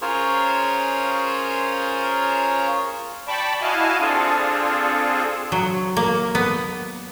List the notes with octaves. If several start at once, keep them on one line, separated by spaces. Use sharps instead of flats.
C#4 F4 G#4 A#4 C5 C#5
D5 G5 A5 B5 C#6 D6
E4 F#4 D#5 F5 G#5 A5
C4 D4 F4 G#4 A4
F#3
A#3
B3